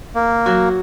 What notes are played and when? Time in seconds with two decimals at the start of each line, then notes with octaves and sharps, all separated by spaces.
0.15 A#3
0.46 F#3 F#4